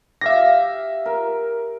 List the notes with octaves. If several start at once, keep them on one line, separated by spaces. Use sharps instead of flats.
G4 E5 F5 A#6
A#4